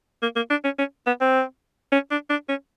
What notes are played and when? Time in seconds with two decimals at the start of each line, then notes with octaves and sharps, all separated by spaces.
0.22 A#3
0.36 A#3
0.50 D4
0.64 C#4
0.78 C#4
1.07 B3
1.21 C4
1.92 C#4
2.11 D4
2.30 D4
2.49 C#4